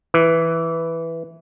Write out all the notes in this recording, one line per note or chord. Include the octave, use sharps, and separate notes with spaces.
E3